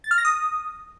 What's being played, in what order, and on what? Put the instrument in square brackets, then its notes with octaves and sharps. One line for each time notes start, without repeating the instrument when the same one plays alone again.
[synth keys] A6
F6
A#6
D#6